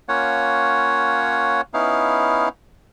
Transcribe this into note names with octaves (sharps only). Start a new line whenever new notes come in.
A#3 C#4 F4 C#5 F#5
B3 C#4 D#4 E4 F5